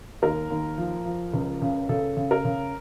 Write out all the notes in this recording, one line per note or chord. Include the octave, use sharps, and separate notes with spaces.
D#2 A#4
D#2
F3
F3
C#2
C#3
C#3 A4
C#3
A#4
C#3